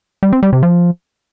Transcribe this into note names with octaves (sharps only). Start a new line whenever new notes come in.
G3
C4
G3
C3
F3